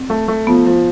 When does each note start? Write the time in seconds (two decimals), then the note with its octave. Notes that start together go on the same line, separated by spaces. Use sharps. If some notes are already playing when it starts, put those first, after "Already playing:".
Already playing: C4
0.10 A3
0.28 A3
0.47 F3 B3
0.67 F3